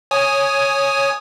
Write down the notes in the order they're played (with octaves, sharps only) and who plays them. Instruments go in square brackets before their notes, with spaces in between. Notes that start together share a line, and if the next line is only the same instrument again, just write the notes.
[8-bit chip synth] C#5 G#5 D#6